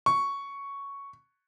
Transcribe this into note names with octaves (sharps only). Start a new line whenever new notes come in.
C#6